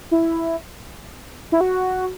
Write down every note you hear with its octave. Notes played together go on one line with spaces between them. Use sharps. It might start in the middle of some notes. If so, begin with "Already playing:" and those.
E4
E4
F#4